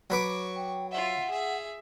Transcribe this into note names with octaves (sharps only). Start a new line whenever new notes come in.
F#3 B4 C#6 D6
G5
F4 E5 F#5
G#4 E5